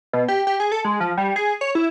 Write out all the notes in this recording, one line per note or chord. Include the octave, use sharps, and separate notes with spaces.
B2
G4
G4
G#4
A4
G#3
F3
G3
G#4
C#5
E4